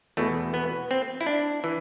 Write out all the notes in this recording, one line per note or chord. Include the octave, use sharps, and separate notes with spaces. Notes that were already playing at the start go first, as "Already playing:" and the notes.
E2 B2 A3
B3
C4
E4
D4
E3